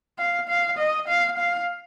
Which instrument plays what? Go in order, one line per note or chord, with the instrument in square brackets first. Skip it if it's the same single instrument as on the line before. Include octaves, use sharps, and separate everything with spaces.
[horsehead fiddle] F5
F5
D#5
F5
F5